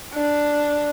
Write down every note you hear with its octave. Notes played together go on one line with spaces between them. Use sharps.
D4